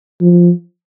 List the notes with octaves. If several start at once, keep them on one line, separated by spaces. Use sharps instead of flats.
F3